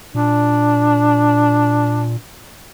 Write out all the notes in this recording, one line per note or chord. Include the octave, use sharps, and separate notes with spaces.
A#2 D4